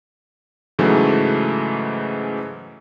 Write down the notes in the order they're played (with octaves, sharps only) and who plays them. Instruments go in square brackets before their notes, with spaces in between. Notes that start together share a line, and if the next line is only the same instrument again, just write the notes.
[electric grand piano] G#2 C#3 E3 F#3 A3